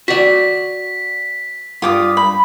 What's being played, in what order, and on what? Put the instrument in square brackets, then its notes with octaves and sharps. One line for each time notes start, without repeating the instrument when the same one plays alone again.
[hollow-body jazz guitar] F#4 D5 [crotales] B6
[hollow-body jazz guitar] G2 [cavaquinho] F4 D6 D#6
[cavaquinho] B5